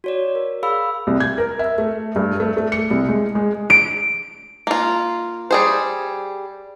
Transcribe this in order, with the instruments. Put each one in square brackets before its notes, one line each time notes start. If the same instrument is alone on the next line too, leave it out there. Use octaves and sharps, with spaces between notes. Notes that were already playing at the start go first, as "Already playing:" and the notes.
[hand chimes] F#4 C#5 D5
A#4
G#4 F5 B5 E6
[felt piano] C2
G#6
A#4
E5
A3
G2
A3
A3
C#7
C2
G#3
G#3
[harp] D7
[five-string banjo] A#3 F4
G3 G#4 C5